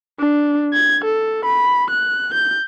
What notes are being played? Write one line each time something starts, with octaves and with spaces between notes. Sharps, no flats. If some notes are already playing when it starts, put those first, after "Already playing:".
D4
G#6
A4
B5
F#6
G6